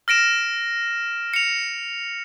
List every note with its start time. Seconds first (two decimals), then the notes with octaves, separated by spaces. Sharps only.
0.08 F6 A#6 D7 E7
1.34 C#7 F7